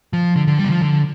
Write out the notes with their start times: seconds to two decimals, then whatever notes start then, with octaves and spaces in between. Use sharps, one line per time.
0.13 F3
0.36 D3
0.47 D3
0.58 G3
0.64 D3
0.70 F3
0.81 D3